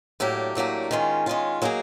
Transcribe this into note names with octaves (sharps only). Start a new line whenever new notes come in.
A2 F#3 A#3 D4 G4
A2 F#3 A#3 D4 G4
D#3 G#3 C#4 F4
D#3 G#3 C#4 F4
F#3 A#3 D#4 G#4